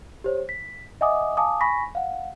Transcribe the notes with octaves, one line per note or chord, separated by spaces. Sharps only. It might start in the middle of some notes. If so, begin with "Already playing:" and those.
G4 C5 C#5
B6
D#5 E5 F#5 G#5 D6 D#6
F5 G#5 A5 D6 D#6
G#5 B5 C#6 A#6 B6
F5 F#5